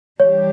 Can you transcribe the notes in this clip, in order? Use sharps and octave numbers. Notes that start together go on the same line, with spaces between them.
E3 G3 D4 G4 C#5